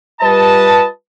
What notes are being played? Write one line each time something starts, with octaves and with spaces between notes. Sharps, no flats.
G3 F4 B4 D#5 A5